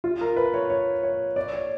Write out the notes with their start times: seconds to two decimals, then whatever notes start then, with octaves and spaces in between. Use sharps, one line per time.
0.04 F4
0.21 A#4
0.36 B4
0.54 C#5
0.70 C#5
1.03 C#5
1.36 D5
1.53 C#5